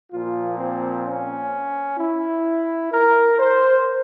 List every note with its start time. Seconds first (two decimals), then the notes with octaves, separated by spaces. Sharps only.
0.11 A#2 F3 A#3 F4
0.58 C4
1.05 C#4
1.98 E4
2.92 A#4
3.38 C5